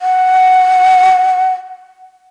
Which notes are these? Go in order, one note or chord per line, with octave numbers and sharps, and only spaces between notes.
F#5